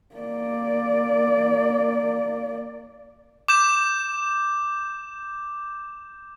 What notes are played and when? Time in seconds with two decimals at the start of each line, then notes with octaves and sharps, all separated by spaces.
0.15 A#3 D5
3.48 D6 G6 E7